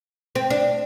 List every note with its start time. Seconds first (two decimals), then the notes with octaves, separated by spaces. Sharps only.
0.35 C4
0.50 D4